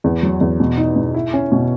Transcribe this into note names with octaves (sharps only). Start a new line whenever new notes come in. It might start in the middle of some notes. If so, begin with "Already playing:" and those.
E2
F#3
E2
B2
D#4
B2
E4
C#4
B2